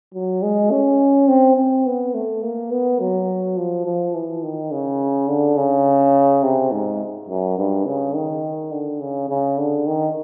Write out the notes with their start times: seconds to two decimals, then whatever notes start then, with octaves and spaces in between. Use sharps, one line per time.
0.14 F#3
0.43 G#3
0.71 C#4
1.28 C4
1.57 C4
1.86 B3
2.14 A3
2.42 A#3
2.71 B3
3.00 F#3
3.57 F3
3.86 F3
4.14 E3
4.43 D#3
4.72 C#3
5.28 D3
5.57 C#3
6.43 C3
6.72 G#2
7.29 F#2
7.58 G2
7.86 C#3
8.15 D#3
8.72 D3
9.00 C#3
9.29 C#3
9.58 D3
9.87 D#3